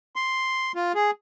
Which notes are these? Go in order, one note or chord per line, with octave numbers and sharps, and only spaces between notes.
C6
F4
G#4